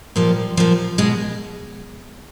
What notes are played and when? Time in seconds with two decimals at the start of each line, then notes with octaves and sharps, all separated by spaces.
0.16 A#2 F3 G3
0.57 A#2 F3
0.98 B2 G#3